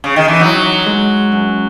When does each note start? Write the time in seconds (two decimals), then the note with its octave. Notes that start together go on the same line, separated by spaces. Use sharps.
0.04 C#3
0.16 D#3
0.28 E3
0.40 F#3 D#4
0.86 G#3
1.32 F#2